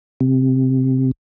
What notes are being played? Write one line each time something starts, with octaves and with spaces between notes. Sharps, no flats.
C3